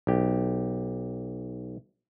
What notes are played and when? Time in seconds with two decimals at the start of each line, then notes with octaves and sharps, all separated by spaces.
0.07 B1 G4